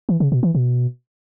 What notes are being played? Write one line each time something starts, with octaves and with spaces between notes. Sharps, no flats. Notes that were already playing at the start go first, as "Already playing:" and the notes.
E3
C#3
B2
E3
B2